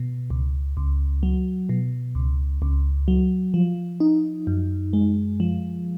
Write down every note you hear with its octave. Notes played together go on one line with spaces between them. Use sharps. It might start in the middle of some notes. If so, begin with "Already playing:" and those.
Already playing: B2
C#2
C#2
F#3
B2
C#2
C#2
F#3
F3
D#4
F#2
G#3
F3